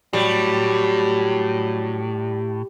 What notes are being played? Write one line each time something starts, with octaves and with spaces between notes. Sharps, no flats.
A2 F#3 G3